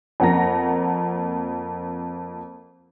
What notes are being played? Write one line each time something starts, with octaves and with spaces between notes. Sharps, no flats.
F2 A#3 F#5 A5 A#5 A#6